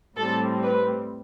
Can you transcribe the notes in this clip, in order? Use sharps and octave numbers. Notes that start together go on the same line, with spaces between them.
A2 G3 C4 A4
B4